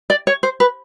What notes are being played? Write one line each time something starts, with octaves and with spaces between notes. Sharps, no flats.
D5
C#5
C5
B4